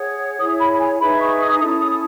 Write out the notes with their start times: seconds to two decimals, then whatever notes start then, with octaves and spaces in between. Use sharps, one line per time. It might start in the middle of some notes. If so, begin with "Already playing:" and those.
Already playing: G#4 C#5 F#5
0.39 E4 G#4 C#5 D#6
0.60 B5
0.80 G#5
1.00 D#4 G#4 B4 E5 B5
1.20 C#6
1.41 D#6
1.60 C#4 E4 A4 D#6
1.81 D#6